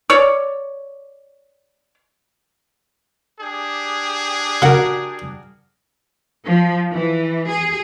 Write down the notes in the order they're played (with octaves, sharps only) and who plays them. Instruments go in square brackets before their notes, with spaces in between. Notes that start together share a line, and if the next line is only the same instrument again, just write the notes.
[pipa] C#5 D5
[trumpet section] D4 G4 G#4
[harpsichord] C#3 F#5 [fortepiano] F#4 A#4
[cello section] F3
E3
G#4